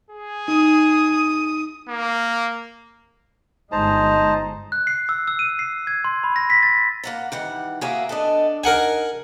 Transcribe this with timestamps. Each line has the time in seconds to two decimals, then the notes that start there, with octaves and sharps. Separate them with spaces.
0.11 G#4
0.48 D#4 D#6
1.89 A#3
3.72 G1 G#3 D#4 C5 A5 A#5
4.72 F#6
4.87 C7
5.09 E6
5.28 E6
5.39 D#7
5.59 C7
5.87 G#6
6.04 C6
6.24 B5
6.36 A#6
6.50 B6
6.63 A6
7.04 A#3 F#5 A#5
7.32 D#3 E3 G3 F#5
7.81 A#3 F#4 G#4 A#4 D5 E5
8.09 A3 B3 D4 A4 D#5
8.64 D#4 G#4 A#4 F#5 G#5